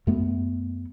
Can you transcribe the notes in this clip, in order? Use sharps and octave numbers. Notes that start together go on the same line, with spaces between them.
F#2 A3 B3